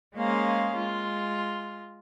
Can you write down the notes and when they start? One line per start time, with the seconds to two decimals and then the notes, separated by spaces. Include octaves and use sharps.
0.15 G#3 A#3 C#4 G#4 C5 F5
0.74 G#3 F4